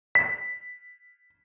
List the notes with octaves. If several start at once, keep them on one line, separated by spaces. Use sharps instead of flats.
B6